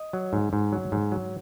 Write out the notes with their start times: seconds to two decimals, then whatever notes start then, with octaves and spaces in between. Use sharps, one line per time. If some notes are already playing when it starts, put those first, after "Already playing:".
Already playing: D#5
0.13 F#3
0.33 G#2
0.53 G#2
0.72 F#3
0.92 G#2
1.12 F#3